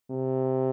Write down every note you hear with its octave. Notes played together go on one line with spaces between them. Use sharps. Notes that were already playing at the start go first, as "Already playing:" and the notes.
C3